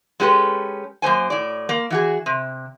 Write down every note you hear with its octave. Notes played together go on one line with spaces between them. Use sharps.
G#3 C#4 G4 A4 B4
F#2 A#3 C5 G#5
A2 D5
A#3
E3 F#4 G#4
C3